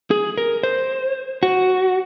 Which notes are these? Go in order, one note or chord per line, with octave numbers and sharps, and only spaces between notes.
G#4
A#4
C5
F#4